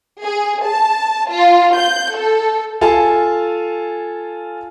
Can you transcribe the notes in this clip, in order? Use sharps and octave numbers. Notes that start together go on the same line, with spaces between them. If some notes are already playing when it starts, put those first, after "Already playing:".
G#4
A5
F4
G6
A4
F4 A4 F5 G#5 A5